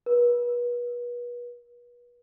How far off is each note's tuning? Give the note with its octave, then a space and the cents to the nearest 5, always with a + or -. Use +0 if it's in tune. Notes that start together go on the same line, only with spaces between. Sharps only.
B4 -35